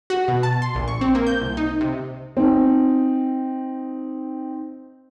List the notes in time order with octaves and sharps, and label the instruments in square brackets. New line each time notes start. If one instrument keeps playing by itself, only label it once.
[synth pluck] F#4
B2
A5
C6
A#1
C#6
C4
A#3
G6
C2
D#4
C3
[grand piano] C4 D#4